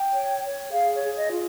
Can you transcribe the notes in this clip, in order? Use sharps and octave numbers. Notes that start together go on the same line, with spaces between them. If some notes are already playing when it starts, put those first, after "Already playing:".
Already playing: G5
C#5
C#5
G#4 F5
C#5
G#4
D#5
F4